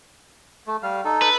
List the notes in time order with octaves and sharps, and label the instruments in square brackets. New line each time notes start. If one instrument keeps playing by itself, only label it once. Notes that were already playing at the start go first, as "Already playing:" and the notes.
[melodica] A3
G3 F5
D#4 A4
[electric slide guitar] B4